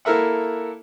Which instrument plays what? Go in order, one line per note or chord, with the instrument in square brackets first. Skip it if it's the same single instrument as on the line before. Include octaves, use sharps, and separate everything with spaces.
[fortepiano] A#3 E4 A4 A#4 E5 F#5